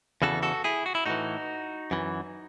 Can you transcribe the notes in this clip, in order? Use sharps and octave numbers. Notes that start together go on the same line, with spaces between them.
E2 C#3 E3 F#4 A4
F#4 A4
E4 G#4
F#4
E4
A2 E3 D#4 F#4
F#2 E3